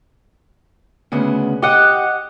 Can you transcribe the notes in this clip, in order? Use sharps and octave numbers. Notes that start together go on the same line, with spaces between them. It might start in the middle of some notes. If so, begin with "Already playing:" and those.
D2 C#3 B3
G4 D#5 F#5